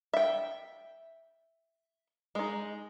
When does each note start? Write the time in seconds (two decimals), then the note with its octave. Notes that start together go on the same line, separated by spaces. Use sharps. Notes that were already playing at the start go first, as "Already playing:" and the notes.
0.14 E5 G5
2.35 G#3 D#4